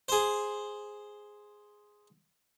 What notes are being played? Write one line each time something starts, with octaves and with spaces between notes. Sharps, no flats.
G#4 C5